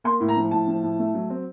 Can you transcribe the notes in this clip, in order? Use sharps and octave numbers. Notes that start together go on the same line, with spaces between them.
A#3 C6
A2
A#5
F3
A2 A5
F3
A2
A3
F#3
C4